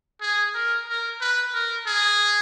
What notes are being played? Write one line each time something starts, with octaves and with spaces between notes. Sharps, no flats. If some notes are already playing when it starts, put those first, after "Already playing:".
G#4
A#4
A#4
B4
A#4
G#4